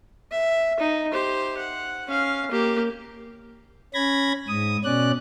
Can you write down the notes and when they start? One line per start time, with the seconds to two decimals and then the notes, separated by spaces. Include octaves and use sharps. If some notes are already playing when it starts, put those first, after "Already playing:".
0.31 E5
0.80 D#4
1.12 G4 C5
1.58 F#5
2.08 C#4 F5
2.51 A#3 G4
3.94 C#4 B5 G#6 A#6
4.48 G#2 D#6
4.84 B2 C#4 D5 F#6